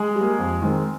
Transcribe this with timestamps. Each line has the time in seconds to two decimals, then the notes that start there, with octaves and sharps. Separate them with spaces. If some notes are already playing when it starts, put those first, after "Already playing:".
Already playing: G#3 G#4
0.15 G3
0.21 A#3
0.38 F2
0.62 D#3 G#3 C4